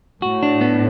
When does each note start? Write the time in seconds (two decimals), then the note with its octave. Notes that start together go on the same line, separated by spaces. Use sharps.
0.22 A2 F#4
0.43 D4
0.61 B3